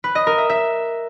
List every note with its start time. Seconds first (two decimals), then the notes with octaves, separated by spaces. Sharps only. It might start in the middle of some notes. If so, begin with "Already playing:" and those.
0.04 B4
0.15 D#5
0.27 A#4
0.38 E5
0.50 E5